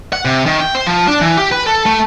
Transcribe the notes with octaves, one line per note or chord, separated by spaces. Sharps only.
F#5
C3
D#3
G5
C5
F3
D4
E3
G4
B4
A4
A3